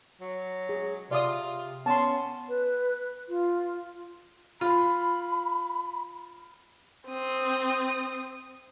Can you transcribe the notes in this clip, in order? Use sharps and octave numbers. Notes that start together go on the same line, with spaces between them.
F#3
G#4
C3 F4 D5 D#6
B3 C#4 A5 C6
B4
F4
F4 B5
C4 D#6